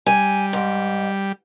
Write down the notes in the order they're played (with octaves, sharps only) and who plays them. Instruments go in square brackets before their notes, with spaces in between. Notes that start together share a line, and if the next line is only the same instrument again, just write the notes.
[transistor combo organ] G3 [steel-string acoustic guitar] G#5
[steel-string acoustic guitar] G#2